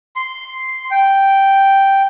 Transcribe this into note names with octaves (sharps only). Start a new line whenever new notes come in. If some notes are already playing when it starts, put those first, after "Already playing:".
C6
G5